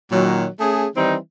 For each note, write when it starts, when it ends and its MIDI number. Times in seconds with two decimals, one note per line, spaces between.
0.12 0.45 46
0.12 0.45 51
0.12 0.45 54
0.60 0.86 57
0.60 0.86 61
0.60 0.86 68
0.97 1.16 51
0.97 1.16 52
0.97 1.16 55
0.97 1.16 60
0.97 1.16 63